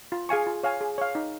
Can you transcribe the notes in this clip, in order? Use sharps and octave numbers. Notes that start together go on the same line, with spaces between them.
F4
G#4 F5 G#5 C#6
F4
C#5 F5 G#5
G#4
C#5 F5
D#4